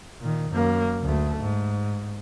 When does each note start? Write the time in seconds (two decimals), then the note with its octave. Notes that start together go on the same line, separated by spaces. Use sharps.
0.21 A#2 D#3
0.51 F#2 A#3
1.02 D2 A3
1.41 G#2